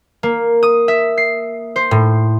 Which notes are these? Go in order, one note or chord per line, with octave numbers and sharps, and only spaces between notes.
A#3
D#6
E5
C7
C5
A2